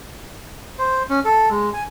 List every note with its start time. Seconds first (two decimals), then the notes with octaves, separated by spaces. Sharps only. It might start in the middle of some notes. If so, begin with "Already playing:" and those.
0.78 C5
1.10 C#4
1.25 A4
1.50 G#3
1.74 G#5